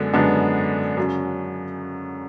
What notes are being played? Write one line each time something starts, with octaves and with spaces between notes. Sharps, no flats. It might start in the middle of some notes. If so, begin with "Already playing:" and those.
Already playing: F#2 D3 G#3 B3
F#2 D3 G#3 B3 D4
F#2 C#3 F#3 C#4